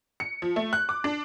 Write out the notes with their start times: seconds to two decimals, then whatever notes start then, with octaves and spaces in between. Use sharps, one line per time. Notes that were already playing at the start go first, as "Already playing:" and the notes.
0.20 C#7
0.42 F3
0.56 A3
0.73 F#6
0.89 D6
1.04 D4